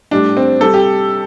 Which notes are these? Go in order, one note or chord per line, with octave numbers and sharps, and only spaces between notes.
A2 G3 D4
C4
C3 G3 A4
G4